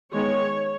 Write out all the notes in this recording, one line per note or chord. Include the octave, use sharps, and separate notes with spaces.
D#3 G#3 B3 C#5